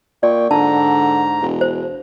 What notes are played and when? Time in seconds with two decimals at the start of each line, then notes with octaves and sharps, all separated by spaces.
0.23 A#2 D5 G5 C#6
0.51 G#2 D3 A5 A#5
1.42 E1
1.61 C5